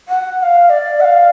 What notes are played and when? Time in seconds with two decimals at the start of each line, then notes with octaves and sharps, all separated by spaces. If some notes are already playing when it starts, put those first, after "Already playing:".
0.09 F#5
0.39 F#5
0.43 F5
0.70 D5
1.00 F#5
1.04 F5